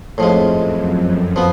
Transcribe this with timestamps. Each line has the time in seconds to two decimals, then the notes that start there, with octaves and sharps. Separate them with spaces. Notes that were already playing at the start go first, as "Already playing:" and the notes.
0.18 F2 A2 F3 G#3
0.48 F#2
0.77 F2
1.07 F#2
1.36 F3 B3